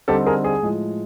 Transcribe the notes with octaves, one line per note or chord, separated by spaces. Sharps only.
D3 G3 C4 D#4 G4 A4
G#4 A#4
G#4
A2 F3 G#3